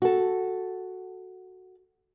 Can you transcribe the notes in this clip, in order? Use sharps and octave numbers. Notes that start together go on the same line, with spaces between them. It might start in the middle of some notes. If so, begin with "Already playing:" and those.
F#4 A4